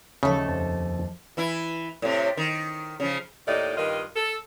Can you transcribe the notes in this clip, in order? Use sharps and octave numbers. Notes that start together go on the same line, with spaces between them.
D#2 C#3 F3 A3 A4
F2 C5 A5
E3 E4
A2 C3
D#3
C#3 F3
D#2 A2 D#4 D5 D#5
G2 D#3 F4 D#5
A4